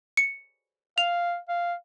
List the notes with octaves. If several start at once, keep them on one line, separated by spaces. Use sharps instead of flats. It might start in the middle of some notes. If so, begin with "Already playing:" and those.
C#7
F5 F7
F5